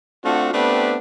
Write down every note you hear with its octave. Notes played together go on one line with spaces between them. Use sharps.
A3 C4 D4 F4 F#4
A3 B3 C4 D4 G4 B4